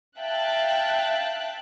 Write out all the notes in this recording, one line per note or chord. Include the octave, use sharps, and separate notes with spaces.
E5 F5 G5 A5 F#6